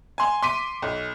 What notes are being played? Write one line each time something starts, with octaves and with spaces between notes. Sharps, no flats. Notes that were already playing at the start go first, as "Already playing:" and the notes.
G#5 C6
C6 D6 B6 D#7
B1